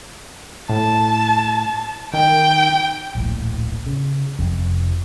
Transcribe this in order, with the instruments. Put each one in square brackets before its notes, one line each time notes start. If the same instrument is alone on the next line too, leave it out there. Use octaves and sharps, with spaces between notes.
[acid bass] A2 [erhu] A5
[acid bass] D#3 [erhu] G5
[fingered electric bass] D1 A#1 A2
C#3
F1 F2